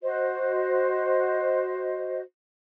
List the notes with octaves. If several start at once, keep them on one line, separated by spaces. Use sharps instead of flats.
F#4 C5 D#5